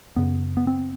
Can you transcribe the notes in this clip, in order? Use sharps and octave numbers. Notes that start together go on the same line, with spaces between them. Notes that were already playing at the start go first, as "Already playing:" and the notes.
F#2 C#3 B3
B3
C4